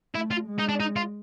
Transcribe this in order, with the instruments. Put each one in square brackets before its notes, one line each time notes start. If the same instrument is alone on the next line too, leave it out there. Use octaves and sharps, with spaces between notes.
[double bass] A3 [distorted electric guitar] E4
[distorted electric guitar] F4
[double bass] G#3
[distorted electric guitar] D#4
D4
D#4
F4